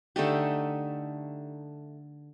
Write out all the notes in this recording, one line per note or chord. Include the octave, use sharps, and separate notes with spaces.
D3 A3 D#4 G4